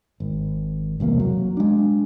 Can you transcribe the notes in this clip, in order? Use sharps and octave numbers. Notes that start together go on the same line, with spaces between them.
G#1
E1 C2 E3 A#3
F#3
G#3 D4